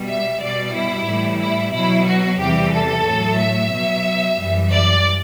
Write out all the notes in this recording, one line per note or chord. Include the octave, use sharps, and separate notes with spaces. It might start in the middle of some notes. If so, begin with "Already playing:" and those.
Already playing: B2 G3
E5
B2 G3 D5
E4
A2 E3 G3
E4
B2 F#3 E4
F#4
E2 C3 E3 G3 G4
A4
A2 F#3
E5
B2 F#3
F#2 E3 G3
D5